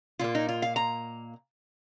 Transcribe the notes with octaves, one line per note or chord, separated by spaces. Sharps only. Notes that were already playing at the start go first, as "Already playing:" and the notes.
A#2 A#3 F4
D#4
F4
F5
A#5